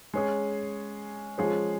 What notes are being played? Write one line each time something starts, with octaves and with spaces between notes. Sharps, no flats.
G#3 C#4 G#4
F3 G#3 C#4 G#4